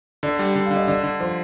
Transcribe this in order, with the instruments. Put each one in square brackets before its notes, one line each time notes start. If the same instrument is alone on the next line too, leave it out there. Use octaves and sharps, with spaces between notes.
[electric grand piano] D3 [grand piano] D5
[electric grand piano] G3
D3
[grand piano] F5
[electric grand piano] D3
[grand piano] D#5
[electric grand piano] D3 [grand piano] D5
[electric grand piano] D3
[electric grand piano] F3 [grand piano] C5